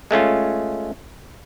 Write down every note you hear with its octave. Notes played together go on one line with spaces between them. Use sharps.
G#3 A3 C#4 F4